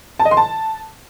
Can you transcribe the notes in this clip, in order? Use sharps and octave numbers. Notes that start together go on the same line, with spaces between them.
A5
D#5
C6
A5